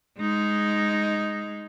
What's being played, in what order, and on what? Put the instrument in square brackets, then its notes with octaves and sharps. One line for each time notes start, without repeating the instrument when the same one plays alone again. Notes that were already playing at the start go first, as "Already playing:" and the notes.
[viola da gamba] G#3 D#4